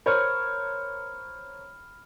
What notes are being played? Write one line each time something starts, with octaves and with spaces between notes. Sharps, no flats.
A#4 C5 C#5 B5 F6